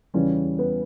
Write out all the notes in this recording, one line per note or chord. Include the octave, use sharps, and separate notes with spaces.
E2 C#3 E3 G3 C#4
B3